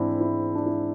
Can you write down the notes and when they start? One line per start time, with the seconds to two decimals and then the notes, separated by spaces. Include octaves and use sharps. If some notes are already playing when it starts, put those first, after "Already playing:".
Already playing: G#2 E3 C4 D4 E4
0.20 E4
0.55 D4
0.65 E4